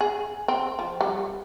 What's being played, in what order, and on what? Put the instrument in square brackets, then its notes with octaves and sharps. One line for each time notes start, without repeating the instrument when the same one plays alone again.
[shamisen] G#4
C4
F3
G3